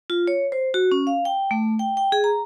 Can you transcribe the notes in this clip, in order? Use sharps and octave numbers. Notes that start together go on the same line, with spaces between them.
F4
C#5
C5
F#4
C#4
F5
G5
A3
G5
G5
G#4
A#5